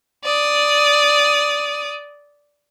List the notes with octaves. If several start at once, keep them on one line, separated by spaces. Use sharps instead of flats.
D5 D#6